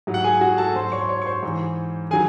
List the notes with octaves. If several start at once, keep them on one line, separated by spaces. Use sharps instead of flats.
G#2 F#3
F#5
G#4 G#5
F#4 F#5
A4 A5
G#2 F#3 C5 C6
C#5 C#6
C6
C#5 C#6
C#6
C5 C6
G#2 E3
D#3 F#3 G#4 G#5